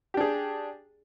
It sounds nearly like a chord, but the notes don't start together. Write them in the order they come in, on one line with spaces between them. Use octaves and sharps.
G4 D4 G#4